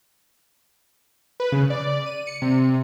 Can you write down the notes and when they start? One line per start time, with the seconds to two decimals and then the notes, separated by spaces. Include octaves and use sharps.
1.40 B4
1.52 C#3
1.70 D5
2.06 D#7
2.27 C#7
2.42 C3